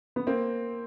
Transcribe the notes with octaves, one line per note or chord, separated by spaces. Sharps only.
B3
A#3 C4